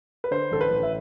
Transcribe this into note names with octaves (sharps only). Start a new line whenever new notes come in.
B4
D3 C5
A1 A4
B4
A1
E5